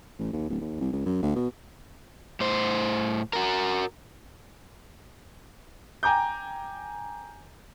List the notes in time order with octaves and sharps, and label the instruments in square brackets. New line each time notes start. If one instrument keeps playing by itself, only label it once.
[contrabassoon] A1
D#2
D1
D#2
C2
C#2
F#2
D2
B2
[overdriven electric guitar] A2 C5
F#4 A#4
[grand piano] G5 G#5 A#5 D6 G6